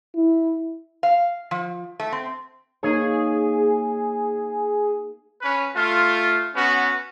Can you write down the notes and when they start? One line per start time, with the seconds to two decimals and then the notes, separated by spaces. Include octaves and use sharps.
0.16 E4
1.03 F5
1.51 F3
2.00 A3
2.12 C4
2.83 A#3 D#4 G#4 C#5
5.42 C#4 B4
5.75 A3 F4
6.55 B3 C#4 F#4